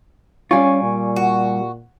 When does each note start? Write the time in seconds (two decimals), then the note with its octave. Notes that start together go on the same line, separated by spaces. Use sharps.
0.51 G3 C#4 F4 G#5 C#6
0.83 A#2
1.16 F#4